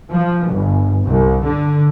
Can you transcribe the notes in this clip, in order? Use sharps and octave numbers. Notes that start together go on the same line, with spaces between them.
F3
G1
C2
D3